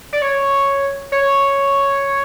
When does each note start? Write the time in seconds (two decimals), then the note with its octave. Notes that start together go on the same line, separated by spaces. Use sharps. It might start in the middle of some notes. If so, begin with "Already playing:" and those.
0.13 D5
0.22 C#5
1.12 C#5